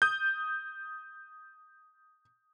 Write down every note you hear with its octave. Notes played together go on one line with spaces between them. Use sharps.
D#6 G6